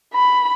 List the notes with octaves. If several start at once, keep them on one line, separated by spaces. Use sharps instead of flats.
B5